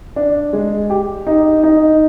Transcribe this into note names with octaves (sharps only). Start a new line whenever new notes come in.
D4
G#3
G4
D#4
D#4